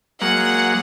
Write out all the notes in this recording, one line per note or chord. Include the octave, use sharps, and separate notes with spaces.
F#3 G#3 A#3 F#5